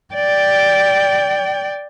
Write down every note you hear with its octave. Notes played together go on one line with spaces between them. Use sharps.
D5 G5